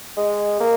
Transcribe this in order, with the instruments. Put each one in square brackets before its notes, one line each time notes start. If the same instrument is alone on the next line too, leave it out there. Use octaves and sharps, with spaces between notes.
[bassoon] G#3
A#3